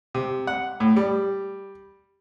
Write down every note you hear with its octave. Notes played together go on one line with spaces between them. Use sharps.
C3
F#5
A2
G3